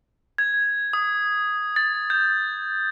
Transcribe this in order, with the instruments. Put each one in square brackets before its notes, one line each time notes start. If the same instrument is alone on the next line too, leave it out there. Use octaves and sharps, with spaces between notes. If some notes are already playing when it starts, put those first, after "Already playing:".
[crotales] G#6
D#6
A6
G6